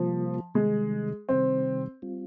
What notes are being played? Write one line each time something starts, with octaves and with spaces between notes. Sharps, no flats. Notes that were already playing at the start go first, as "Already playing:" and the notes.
Already playing: C3 F3 G3 A#3 F4
C3 D#3 G3 G#3
C3 D#3 G3 C4
G3 C4 F4